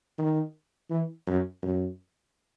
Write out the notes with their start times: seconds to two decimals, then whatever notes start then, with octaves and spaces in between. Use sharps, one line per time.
0.18 D#3
0.89 E3
1.27 F#2
1.62 F#2